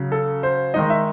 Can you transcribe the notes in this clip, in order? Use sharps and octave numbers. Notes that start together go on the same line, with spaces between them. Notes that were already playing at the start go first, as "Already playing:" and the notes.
Already playing: C#3 F#3 C#4
A4
C5
D#3 G#3 D#4 D#5
E5